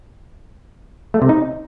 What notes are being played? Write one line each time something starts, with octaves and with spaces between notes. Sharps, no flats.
A3
C3
D#4